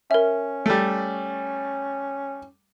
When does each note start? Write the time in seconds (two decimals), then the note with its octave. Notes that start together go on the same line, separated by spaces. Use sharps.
0.11 C#4 A#4 E5
0.66 G3 A3